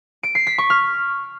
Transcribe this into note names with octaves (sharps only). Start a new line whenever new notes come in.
D7
C7
B6
C#6
F6